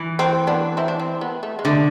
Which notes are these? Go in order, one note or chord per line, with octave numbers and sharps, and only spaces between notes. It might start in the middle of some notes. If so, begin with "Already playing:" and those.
Already playing: E3
C4
B3 D4
C4 E4
D4
C4
B3
A3
G#3
D3 A3